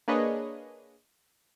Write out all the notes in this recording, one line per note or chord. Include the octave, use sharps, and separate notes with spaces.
A#3 D4 G#4 B4 C#5 D#5